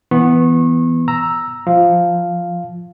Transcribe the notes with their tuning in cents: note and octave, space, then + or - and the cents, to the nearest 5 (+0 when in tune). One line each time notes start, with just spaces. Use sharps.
E3 +0 B3 +0 C#6 -35
A#5 +0 E6 +0
F3 +0 F5 +0